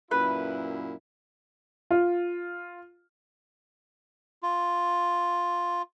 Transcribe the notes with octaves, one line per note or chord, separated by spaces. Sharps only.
F#2 A#2 E4 B4
F4
F4